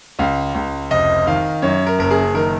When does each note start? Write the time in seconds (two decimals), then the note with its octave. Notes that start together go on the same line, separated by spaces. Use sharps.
0.19 C#2 F5
0.54 C#2
0.91 F1 D#5
1.27 D#3 F5
1.62 F#2 C#5
1.87 A#4
1.99 F#1 A#4
2.11 G#4
2.34 D#3 A#4